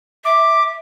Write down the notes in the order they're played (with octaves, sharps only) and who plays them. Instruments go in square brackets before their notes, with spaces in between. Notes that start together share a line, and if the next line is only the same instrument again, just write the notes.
[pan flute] E5 [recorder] D6